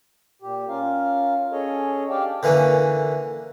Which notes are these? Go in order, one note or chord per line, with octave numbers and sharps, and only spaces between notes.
A#2 G4
C#4 F4 A#4 F5
C#4 G#4 A4 C#5 D#5
D4 G4 D5 F5 G5 A5
D3 E3 A#3 C#4